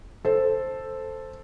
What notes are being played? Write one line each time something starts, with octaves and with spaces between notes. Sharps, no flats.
A4 C5